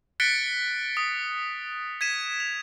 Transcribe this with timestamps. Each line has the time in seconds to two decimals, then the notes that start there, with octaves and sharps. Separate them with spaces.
0.20 F#6 A6 B6 C#7 D7 G7
0.97 D#6
2.01 G#6 B6 D#7 E7
2.40 F7